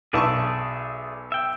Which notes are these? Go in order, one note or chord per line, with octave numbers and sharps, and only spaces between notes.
B1 G#4 D5 E5 A5 C#6
E5 G5